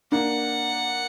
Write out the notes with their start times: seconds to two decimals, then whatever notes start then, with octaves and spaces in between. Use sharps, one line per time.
0.12 A#3 D4 F#5